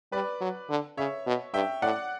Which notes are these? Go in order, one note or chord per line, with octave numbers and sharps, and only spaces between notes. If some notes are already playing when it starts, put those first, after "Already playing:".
G3 B4 D5
F#3
D3
C#3 C#5 E5
B2
G2 E5 G5
A2 D5 F#5